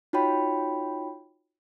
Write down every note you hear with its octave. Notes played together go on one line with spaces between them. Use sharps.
D#4 F4 F#4 C#5 G5 B5